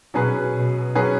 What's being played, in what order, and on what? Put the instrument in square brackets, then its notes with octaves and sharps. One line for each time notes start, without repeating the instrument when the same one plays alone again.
[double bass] B2 [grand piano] F#3 C#4 G#4 B4
[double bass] B2
[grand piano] F#3 C#4 G#4 B4